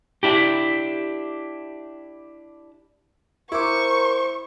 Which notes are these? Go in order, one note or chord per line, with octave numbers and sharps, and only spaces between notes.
D4 E4 G4
E4 A#4 C5 C#6 D6